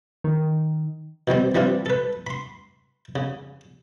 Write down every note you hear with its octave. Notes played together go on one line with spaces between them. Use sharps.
D#3
B2 D#3 G3 C4
E3 G3 C4 D4 F4
A4 B4
B5 C6
C#3